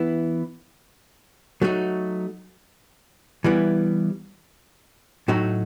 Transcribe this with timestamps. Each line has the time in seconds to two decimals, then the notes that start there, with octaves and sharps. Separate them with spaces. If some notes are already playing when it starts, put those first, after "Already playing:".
Already playing: E3 B3 E4
1.62 F#3 A3 D#4 F#4
3.44 E3 G3 B3 E4
5.28 A2 F#3 A3 D#4 F#4